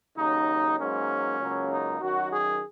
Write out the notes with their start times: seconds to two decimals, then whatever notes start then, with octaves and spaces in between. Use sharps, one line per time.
0.16 D#2 C#3 F#3 D#4
0.78 G#2 F#3 A#3 C#4
1.39 C#2 C#3 F#3 A#3
1.69 D#4
2.00 F#2 D#3 F#3 F#4
2.31 G#4